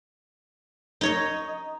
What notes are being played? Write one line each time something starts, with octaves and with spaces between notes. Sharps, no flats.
D#4 C#5 D#5